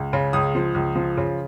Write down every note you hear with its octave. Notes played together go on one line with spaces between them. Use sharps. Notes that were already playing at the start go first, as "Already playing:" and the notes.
Already playing: C#2
C#3
C#2 D#6
F3
C#2
F3
C#3